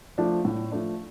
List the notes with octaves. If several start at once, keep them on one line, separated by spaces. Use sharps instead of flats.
F3 A3 D4
A2
F3 A3 D4